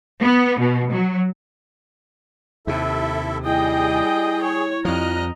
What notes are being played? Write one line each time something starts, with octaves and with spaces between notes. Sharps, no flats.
B3
B2
F#3
D#2 C3 E4 A4 E5
G3 E4 G#4 D#5 G5
C#5
F2 F3 G3 D#5 A#5 F6 F#6